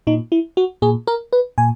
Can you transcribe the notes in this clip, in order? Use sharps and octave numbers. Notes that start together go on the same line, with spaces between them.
A#2 D#4
E4
F#4
A#2 G#4
A#4
B4
A#2 G#5